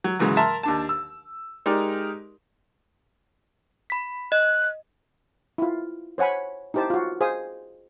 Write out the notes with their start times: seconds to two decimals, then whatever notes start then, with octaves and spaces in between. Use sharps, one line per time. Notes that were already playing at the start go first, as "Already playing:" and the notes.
0.04 F#3
0.19 G#2 C#3 E3 F#3 G#3
0.37 A#4 E5 A5 A#5 C6
0.63 D#2 D4 A5
0.89 E6
1.66 G#3 D#4 G4 A#4 D5
3.90 B5 B6
4.32 D#5 F#6
5.58 E4 F4
6.18 C5 C#5 F#5 G#5 B5
6.74 D#4 E4 G4 C5 A5
6.90 F4 F#4
7.21 G#4 C5 F5 G#5 D#6